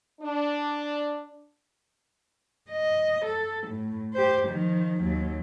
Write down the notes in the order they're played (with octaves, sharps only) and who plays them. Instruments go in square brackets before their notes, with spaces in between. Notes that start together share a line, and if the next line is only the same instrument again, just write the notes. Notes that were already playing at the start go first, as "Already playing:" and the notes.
[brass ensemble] D4
[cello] D#5
A4
A2
G4 C5
D#3 F3
D#2 F#3